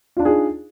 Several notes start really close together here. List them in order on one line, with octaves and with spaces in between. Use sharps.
F4 D4 D#4 G#4